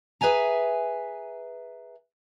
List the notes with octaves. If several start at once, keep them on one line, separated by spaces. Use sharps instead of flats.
G#4 B4 E5 G#5 A#5